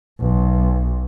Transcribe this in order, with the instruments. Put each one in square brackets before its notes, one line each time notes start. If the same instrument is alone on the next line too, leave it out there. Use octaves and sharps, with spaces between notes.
[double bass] B1